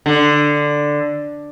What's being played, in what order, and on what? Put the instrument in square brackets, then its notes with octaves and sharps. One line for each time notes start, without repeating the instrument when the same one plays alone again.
[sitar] D3